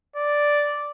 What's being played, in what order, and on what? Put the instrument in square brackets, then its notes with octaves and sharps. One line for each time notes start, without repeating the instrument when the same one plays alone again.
[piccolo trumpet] D5